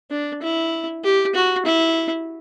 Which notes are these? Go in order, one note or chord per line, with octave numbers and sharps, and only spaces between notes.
D4
E4
G4
F#4
E4